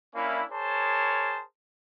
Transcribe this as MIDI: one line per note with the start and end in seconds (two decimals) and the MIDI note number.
0.15 0.44 58
0.15 0.44 61
0.15 0.44 62
0.15 0.44 64
0.52 1.42 68
0.52 1.42 70
0.52 1.42 72
0.52 1.42 73
0.52 1.42 81